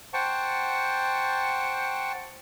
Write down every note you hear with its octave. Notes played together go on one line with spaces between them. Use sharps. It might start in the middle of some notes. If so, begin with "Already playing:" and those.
C5 F#5 G5 A5 C#6